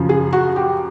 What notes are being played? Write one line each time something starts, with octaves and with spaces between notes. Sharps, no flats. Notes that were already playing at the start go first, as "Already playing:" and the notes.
Already playing: F#2 C#3 F3
G#4
F#4
G4